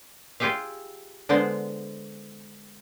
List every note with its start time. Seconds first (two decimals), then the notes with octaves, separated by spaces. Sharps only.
0.40 F4 G4 G#4 E5 F5
1.29 D3 G#3 B3 C5 D5